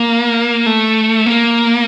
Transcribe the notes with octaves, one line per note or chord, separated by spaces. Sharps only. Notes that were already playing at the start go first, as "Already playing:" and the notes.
Already playing: A#3
A3
A#3